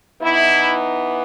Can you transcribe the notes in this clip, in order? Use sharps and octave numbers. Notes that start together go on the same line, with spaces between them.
E3 B3 D#4 E4